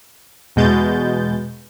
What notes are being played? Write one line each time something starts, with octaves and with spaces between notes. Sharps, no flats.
E2 B2 G#3 G6 A6